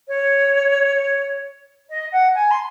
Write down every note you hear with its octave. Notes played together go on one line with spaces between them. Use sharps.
C#5
D#5
F#5
G#5
C6